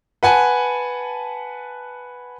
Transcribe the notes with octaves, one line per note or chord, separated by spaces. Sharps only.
B4 F#5 G#5 A5